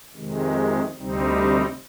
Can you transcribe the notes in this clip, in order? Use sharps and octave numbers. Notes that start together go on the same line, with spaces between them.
F2 C3 D#3 G#3
D2 C3 G3 C4 D#4